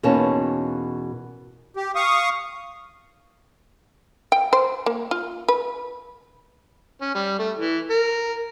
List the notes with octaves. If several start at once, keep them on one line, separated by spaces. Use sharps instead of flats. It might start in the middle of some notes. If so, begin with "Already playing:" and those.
E2 B2 A#3 C#4 D#4 A5
G4
F5 C#6 D#6
G5
C5
A#3
F4
B4
C#4
G3
A3
E3
A#4